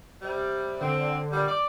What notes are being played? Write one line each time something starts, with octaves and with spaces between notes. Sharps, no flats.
C3 G3
D3 C4
A#2 G3
D5